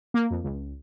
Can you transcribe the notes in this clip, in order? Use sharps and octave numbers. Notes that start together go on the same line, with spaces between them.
A#3
F2
C#2